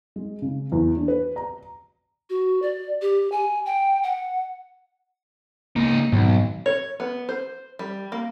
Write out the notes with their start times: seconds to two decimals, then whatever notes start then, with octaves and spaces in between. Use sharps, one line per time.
0.16 G#3
0.42 C#3
0.72 E2
0.97 D4
1.08 B4
1.36 A#5
2.30 F#4
2.62 D5
3.02 G4
3.32 G#5
3.66 G5
4.03 F#5
5.76 C#2 A#3 D#4
6.12 B1 G#2 D#3
6.66 C#5
7.00 B3
7.29 C5
7.79 G3
8.12 A#3